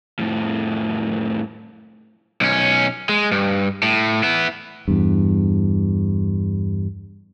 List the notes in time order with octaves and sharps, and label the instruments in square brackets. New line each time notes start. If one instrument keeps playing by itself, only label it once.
[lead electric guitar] F2 A2
[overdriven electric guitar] B1 C#4
G#3
G2
A2
B3 E4
[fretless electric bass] E2 G2